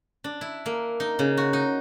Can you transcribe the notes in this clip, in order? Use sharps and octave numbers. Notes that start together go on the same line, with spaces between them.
D4
E4
A#3
D#4
C#3
F#4
D#4